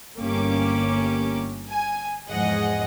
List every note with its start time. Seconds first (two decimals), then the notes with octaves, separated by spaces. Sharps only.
0.18 G1 A#3 C#4 G4 D6
1.70 G#5
2.29 E2 G#2 F3 G#4 D#5 F#5